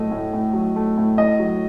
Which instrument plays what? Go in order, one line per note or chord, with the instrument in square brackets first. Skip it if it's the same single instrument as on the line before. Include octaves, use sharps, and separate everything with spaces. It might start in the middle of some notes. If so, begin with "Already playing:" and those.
Already playing: [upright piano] A2 F#3 A3 D#5
A2
A2
F#3
A3
A2
A2 D#5
F#3